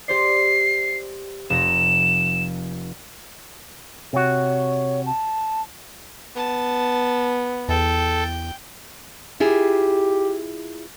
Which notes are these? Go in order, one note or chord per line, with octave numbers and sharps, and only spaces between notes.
G4 C5 D5 C7
F1 A#6 E7
C3 F#4 C#5
A5
B3 A5
E2 A4 G5
E4 F4 G4 G#4